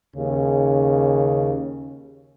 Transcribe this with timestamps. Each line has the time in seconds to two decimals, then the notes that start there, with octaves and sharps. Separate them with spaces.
0.16 D#2 C#3